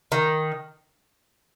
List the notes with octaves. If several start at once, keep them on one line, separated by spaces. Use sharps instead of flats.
D#3